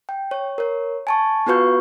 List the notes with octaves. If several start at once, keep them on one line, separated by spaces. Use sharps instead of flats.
G5
C#5
A#4 C#5
G#5 A5 C#6
B3 F4 F#4 B4 C#6 G6